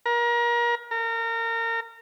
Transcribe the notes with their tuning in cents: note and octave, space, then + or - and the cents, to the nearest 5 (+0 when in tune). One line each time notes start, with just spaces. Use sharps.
A#4 +30
A#4 -30